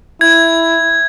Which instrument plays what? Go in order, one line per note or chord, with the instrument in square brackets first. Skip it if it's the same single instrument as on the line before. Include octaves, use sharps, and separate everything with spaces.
[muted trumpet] E4 [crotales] G#6